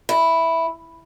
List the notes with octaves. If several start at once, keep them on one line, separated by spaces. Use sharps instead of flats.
E4